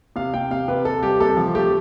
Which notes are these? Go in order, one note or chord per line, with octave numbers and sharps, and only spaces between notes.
C3 F5
C3 G5
C3 F5
C3 B4
C3 A4
G3 G4
C3 A4
F3
A3 G4